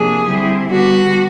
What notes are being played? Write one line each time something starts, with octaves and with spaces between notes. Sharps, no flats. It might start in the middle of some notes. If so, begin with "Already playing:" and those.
Already playing: C3 F3 A#3 D4 G#4
D3 G3 C4 E4
D3 G3 B3 D4 F#4